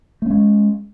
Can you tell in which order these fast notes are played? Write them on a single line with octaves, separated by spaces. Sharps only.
A3 C#4 G#3